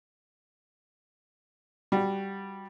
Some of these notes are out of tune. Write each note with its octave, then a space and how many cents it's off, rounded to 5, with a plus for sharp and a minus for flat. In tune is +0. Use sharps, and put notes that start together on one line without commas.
G3 +0 F#4 +0